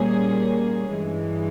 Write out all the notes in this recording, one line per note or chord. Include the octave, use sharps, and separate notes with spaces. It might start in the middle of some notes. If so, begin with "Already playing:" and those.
Already playing: A#2 G3 A#3 C#4 G#4
G2 E3 G#3